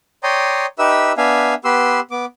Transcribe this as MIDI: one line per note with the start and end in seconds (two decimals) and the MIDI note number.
0.23 0.66 73
0.23 0.66 74
0.23 0.66 79
0.23 0.66 82
0.23 0.66 84
0.23 0.66 87
0.79 1.13 63
0.79 1.13 67
0.79 1.13 71
0.79 1.13 76
0.79 1.13 88
1.17 1.54 59
1.17 1.54 62
1.17 1.54 76
1.17 1.54 77
1.17 1.54 80
1.65 2.00 59
1.65 2.00 67
1.65 2.00 71
1.65 2.00 84
1.65 2.00 88
2.11 2.25 59
2.11 2.25 86